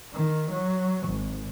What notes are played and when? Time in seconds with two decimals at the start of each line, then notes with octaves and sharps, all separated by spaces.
0.13 D#3
0.51 F#3
1.08 G#1